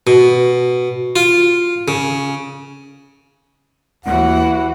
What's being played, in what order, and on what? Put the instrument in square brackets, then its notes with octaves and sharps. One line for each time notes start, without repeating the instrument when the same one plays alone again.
[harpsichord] B2
F4
C#3
[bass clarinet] D#2 [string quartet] E3 F#4 [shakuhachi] F#5